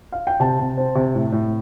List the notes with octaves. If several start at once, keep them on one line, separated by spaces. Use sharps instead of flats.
F5
G5
C3 A5
C3
C4
C3
A2
A2